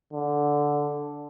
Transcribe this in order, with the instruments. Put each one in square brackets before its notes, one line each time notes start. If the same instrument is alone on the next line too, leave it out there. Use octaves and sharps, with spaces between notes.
[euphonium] D3